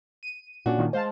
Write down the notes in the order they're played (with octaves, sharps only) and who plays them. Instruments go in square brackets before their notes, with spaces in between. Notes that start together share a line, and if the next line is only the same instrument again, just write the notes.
[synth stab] D#7
[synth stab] A#2 [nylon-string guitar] C#4 D4 F#4
[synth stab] A#2 D#3
[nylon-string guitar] G#3 [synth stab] C5 F5 A5